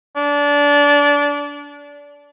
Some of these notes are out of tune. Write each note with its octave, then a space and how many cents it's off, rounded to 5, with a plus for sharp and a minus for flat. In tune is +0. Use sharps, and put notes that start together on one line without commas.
D4 -25